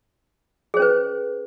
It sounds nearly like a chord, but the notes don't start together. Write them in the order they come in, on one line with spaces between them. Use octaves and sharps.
G#4 C5 C#4 B4